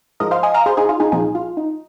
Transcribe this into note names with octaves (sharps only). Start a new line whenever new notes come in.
G#2 F3 A#4 D#5
C5 F5
D#5 G#5
F5 A#5
G#4 C5
D#4 G#4
F4
D#4 G#4
C2 A#2 F3 D#4 G#4
F4
D#4